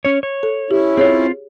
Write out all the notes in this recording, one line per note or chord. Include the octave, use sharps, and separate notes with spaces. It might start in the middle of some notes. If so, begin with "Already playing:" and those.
C#4 C#5
C#5
A4
C#4 E4 G4
C4 F4 G#4 C#5